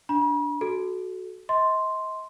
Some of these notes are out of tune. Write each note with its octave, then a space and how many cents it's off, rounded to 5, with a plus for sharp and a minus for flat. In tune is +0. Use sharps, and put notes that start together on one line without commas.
D4 -10 B5 -45
F#4 +0 A4 -25
D#5 +35 C6 +0